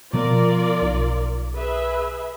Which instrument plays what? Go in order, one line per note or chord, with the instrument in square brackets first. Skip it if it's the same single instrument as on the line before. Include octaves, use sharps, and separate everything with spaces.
[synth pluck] B2 F3 [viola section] F4 A#4 D5
[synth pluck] B1
[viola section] G#4 B4 E5